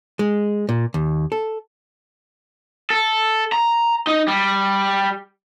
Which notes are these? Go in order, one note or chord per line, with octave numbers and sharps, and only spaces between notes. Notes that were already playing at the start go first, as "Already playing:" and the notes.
G#3
A#2
D#2
A4
A4
A#5
D#4
G3